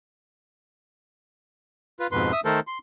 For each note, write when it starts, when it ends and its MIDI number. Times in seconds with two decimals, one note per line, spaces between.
2.00 2.07 65
2.00 2.07 71
2.12 2.32 41
2.12 2.32 44
2.12 2.32 47
2.12 2.32 71
2.12 2.32 84
2.32 2.41 76
2.32 2.41 87
2.45 2.60 51
2.45 2.60 57
2.45 2.60 69
2.45 2.60 70
2.45 2.60 72
2.67 2.78 84